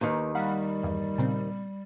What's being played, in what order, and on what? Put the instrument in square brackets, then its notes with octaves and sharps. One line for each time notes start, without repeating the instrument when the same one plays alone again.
[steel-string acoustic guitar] D#2 D#3 [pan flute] B4
[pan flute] G3 [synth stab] F5 F#5 B5
[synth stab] E2 G2
A#2 C#3 C4